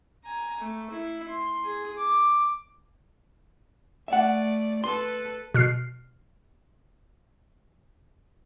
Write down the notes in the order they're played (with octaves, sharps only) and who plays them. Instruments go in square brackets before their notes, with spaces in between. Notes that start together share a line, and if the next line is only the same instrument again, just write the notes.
[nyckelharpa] G#5 A#5
A3
E4
C6
G#4
D6
[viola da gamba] A3 D5 [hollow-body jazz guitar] E5 F#5
[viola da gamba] A4 B4 [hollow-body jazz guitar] C6
[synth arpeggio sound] B2 F6 C7